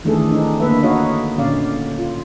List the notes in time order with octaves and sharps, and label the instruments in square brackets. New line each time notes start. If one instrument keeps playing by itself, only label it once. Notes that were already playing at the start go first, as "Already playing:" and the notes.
[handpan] D#3 E3 A3 D4 G#4 A4
C4 D4 D#4
D3 A#3 B4 E5
D#4 F#4 C#5 D#5 F5
A#2 D3 C#4 D5 F5
F4